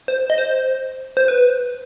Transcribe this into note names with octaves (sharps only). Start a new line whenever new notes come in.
C5
D#5
C5
C5
B4